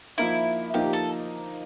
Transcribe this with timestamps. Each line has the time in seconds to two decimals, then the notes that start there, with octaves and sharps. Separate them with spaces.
0.18 F3 A#3 D#4 E4
0.74 F3 A#3 D#4 G4
0.93 A4